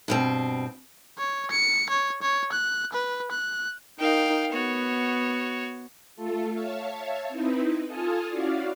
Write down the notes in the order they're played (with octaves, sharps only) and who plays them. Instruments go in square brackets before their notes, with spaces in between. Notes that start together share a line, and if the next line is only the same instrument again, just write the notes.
[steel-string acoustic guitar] G2 B2 C4
[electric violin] C#5
C#7
C#5
C#5
F#6
B4
F#6
[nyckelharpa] D#4 A#4 [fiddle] F5 G5
[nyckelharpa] B3 [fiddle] F#4 C#5
[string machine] A3 F4 A4
C#5 E5 F5 A5
C4 D#4 E4 B4
F4 A4 G#5 A5 D#6 F6
C#4 E4 F#4 D5 F5